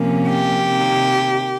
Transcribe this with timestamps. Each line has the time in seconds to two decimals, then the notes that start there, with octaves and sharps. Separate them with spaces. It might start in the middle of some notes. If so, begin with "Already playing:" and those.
Already playing: C3 F3 A#3 C#4
0.29 G4
0.67 C3 D#3 A#3